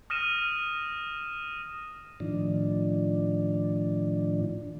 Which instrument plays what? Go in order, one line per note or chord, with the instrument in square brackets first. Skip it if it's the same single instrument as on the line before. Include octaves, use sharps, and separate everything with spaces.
[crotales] D#6 F6 A#6 D#7 E7
[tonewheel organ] A2 D#3 F3 D4